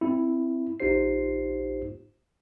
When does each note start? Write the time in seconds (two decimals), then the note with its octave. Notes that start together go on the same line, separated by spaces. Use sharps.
0.01 C4 E4
0.80 A#1 D#4 F4 G4 C5 C7